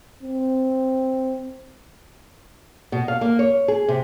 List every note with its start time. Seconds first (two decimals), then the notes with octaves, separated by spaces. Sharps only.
0.23 C4
2.92 B2
3.08 F5
3.21 A#3
3.39 C#5
3.68 G#4
3.88 C3